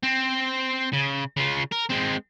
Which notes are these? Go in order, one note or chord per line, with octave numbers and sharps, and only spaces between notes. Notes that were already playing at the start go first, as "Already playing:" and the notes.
C4
C#3
C#3 F4
A#4
G#3 C4